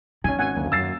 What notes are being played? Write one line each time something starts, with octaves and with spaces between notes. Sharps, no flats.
D#3 C#4 G#5
G#1 F#5 G#5
F#1 D2 A#3
F#2 E6 A6 C7